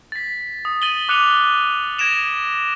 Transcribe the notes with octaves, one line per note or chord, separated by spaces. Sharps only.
A6 B6
D#6
A6 D#7 F#7 G7
D6 F#6 C#7 D#7 F7 G7
G#6 A#6 D7 E7 F7